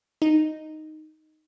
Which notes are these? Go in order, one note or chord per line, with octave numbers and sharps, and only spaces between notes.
D#4